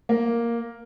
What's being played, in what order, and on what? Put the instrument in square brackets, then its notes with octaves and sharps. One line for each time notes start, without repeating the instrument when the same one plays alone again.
[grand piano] A#3